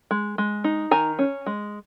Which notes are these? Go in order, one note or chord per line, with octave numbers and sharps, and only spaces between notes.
G#3
G#3
D#4
D#3 G#5 A#5
C#4
G#3